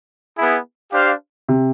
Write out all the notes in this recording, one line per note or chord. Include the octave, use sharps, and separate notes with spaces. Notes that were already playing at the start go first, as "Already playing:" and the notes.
B3 E4 G#4
D4 G4 C5 F5
C3